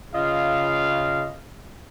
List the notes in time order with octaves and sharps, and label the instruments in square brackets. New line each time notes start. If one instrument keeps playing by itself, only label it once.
[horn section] C#3 F4 D#5 F5